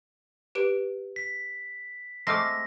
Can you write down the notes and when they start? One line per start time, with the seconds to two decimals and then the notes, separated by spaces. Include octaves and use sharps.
0.55 G4 B4 D7
1.16 B6
2.27 G#3 A3 C4 D6 F6 A#6 C7